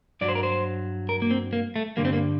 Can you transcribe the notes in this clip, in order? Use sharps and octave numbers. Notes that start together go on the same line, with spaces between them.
G2 F#3 D5
C5
A#4
C5
A#4
A#3
C4
A#3
A3
G2 D3 G3 A#3
C4
A#3